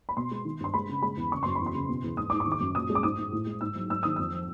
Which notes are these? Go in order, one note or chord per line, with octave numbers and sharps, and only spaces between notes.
B5
B2 C6
G#3
D#3
G2 C6
G#3 B5
C#3
G#3 B5
E2
C#3 C#6
F#2 C6
E2 B5
C6
C#3
B2
E2
G#2 D#6
G#2 D6
C#6
D#3
D6
F#2
A#2 D#6
G#3
D6
G#2 D#6
G#2
A2
G#3
G#2 E6
F#3
G#2 E6
D#3 D#6
F2 E6
F3